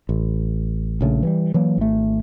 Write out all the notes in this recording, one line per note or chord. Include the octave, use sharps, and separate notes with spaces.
A1
A#1 C#3 A3
E3 F#3 G3
E3 F#3 A#3
G#1 A3